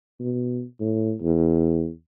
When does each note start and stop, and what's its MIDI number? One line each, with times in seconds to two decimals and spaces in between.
0.20 0.63 47
0.81 1.14 45
1.21 1.90 40